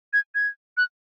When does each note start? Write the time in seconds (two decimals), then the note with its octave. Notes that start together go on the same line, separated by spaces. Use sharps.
0.13 G#6
0.35 G#6
0.77 F#6